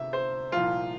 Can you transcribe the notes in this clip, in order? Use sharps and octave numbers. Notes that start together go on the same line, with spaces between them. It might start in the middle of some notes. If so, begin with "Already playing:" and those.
Already playing: G1 C3 E5
C5
C2 A#2 F3 F4